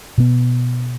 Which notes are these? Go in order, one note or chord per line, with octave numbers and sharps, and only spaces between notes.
B2 B3